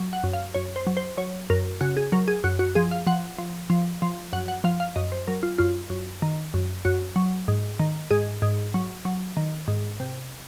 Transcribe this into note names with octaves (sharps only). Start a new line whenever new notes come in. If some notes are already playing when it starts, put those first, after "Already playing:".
Already playing: F#3
F#5
F#2
F5
F#2 C#5
C5
F#3
C5
F#3 C#5
F#2 A#4
C#3 F#4
G#4
F#3 A#4
G#4
F#2 F#4
F#4
F3 G#4
F5
F3 F#5
F3
F3
F3
F#2 F#5
F#5
F3 F5
F5
F#2 D#5
C5
F#3 A#4
F4
F#2 F4
F#2
D#3
F#2
F#2 F#4
F#3
G#2
D#3
G#2 G#4
G#2
F#3
F#3
D#3
G#2
C3